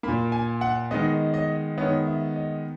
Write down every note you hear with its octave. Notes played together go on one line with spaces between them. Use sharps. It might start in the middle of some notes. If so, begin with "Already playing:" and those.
A#2 A#3 B5
G#5
F#5
D#3 G#3 B3 D#5
D#5
D#3 G#3 B3 C#5
E5
D#5